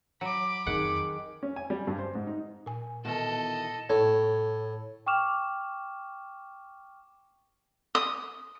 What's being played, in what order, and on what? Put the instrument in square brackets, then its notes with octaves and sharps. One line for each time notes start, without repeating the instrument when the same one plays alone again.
[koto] F#3 [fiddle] B5 D6
[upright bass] F2 [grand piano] D#3 G#4 [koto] F#5
[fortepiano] C#4
G#5
G3
G2
C5
G#2
D#4
[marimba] A#2 G#5
[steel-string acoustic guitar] B2 D#3 E3 [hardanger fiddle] A4 D#5
[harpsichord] A2 [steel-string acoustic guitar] A4 [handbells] C#5
[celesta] G5 C#6 D6 F6 E7 F7
[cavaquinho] D#6